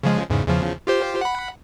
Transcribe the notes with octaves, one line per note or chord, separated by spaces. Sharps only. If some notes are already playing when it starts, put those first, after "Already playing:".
C#3 F3 G#3
E2 G#2 C#3
E2 C#3 F3
F4 G4 C5
F#5 B5